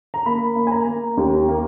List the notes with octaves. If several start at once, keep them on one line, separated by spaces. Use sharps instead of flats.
A#5
A#3 B5
A#3
G#5
A#5
A#3
D#2
A#3